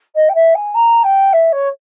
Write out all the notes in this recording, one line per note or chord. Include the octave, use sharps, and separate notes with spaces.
D#5
G5
E5
G#5
A#5
G5
E5
C#5